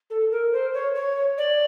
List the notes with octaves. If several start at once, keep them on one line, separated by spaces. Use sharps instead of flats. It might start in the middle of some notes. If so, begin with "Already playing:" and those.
A4
A#4
C5
C#5
C#5
D5